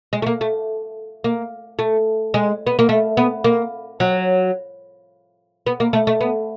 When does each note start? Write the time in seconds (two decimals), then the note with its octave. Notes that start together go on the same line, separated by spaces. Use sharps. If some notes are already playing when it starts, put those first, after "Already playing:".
0.13 G#3
0.22 A3
0.26 A#3
0.41 A3
1.24 A#3
1.79 A3
2.34 G#3
2.67 B3
2.79 A#3
2.89 A3
3.17 B3
3.44 A#3
4.00 F#3
5.66 B3
5.80 A#3
5.93 A3
6.07 A3
6.21 B3